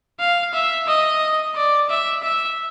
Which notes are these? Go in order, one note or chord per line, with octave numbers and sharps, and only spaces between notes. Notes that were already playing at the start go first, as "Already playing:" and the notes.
F5
E5
D#5
D5
E5
E5